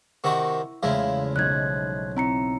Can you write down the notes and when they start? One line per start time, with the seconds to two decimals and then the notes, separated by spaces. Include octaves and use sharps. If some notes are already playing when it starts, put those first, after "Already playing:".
0.24 C3 D#3 E4 F#4 C#6
0.83 E2 C#3 F3 G#3 A3 E4 F5
1.36 B1 D#4 F#5 F#6 G#6
2.17 C4 E4 A#5 C#7